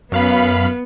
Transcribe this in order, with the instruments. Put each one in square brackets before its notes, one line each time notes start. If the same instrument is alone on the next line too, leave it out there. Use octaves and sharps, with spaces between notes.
[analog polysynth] F#2 F5 B5 [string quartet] B3